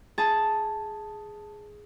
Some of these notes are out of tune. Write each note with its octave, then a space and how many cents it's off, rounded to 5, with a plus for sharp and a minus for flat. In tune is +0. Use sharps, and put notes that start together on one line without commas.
G#4 +5 A5 +0